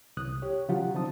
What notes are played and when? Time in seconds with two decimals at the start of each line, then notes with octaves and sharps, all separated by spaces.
0.17 C2 D#6 F#6
0.42 G4 C#5
0.69 C#3 F3 F#3 F4 G4 F#5
0.94 D3 C4 D#4 A5 D#6